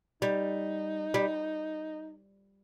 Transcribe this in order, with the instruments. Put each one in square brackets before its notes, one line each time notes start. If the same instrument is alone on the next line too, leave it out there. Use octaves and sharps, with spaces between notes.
[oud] G3 [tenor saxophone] D#4
[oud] G3